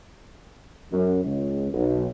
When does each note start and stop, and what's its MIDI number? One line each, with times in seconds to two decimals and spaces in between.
0.92 1.21 42
1.25 1.68 37
1.73 2.07 35